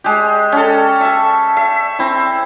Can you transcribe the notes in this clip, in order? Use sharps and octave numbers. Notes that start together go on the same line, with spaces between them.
G#3 G4
C#4 A4
E5 A5
E5
C4 E4